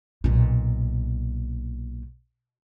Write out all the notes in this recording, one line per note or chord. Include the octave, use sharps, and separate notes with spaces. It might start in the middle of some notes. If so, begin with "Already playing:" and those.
B1 A#2